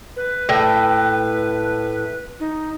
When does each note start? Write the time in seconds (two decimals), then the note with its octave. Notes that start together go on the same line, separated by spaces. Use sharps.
0.16 B4
0.49 A2 G5
2.40 D#4